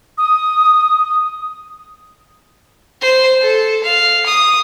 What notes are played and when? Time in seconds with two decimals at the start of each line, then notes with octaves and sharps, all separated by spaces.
0.18 D#6
3.01 C5
3.42 A4
3.83 F5
4.26 D#6